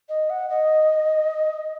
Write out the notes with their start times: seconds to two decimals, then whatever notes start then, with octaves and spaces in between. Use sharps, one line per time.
0.09 D#5
0.30 F#5
0.50 D#5